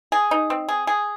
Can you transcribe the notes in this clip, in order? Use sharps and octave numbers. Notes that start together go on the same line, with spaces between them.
G#4
D#4
C4
G#4
G#4